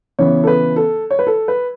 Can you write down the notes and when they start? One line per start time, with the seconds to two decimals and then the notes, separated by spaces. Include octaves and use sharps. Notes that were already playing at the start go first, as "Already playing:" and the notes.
0.19 C#3 E3 B3 C#5
0.43 A4
0.47 B4
0.76 A4
1.10 C#5
1.19 B4
1.27 A4
1.48 B4